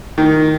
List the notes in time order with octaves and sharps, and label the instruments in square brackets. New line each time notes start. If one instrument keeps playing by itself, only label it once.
[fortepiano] D#3